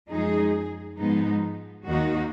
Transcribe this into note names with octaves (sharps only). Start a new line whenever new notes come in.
F#2 F3 G#3 D#4 G#4
G#2 F3 G#3 B3 D#4
D#2 D#3 A#3 D#4 F#4